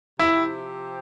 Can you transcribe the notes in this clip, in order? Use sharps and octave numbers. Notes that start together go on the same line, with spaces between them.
C3 F3 C4 E4 G4